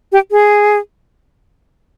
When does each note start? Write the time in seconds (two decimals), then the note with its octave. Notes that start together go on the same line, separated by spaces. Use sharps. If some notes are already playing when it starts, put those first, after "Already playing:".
0.12 G4
0.31 G#4